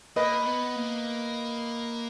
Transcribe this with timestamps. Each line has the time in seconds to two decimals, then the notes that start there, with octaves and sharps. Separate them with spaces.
0.16 A#3 B4 D#5
0.46 B3
0.76 A#3